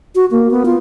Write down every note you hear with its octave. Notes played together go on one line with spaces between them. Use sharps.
F#4
A#3
B3
F4